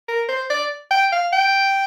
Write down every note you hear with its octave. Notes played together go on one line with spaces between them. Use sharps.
A#4
C5
D5
G5
F5
G5